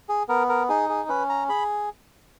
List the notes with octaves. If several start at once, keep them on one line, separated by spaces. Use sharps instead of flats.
G#4
B3 A#4
A#4
D#4 G#4
G#4
C#4 B4
A#5
G#4 B5